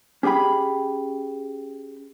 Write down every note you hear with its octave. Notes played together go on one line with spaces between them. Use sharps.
C#4 G4 G#4 G5 B5